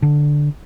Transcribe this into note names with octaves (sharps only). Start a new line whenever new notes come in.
D3